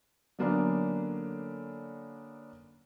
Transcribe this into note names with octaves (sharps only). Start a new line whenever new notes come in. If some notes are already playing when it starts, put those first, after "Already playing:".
D3 F#3 A#3 B3 C#4 D4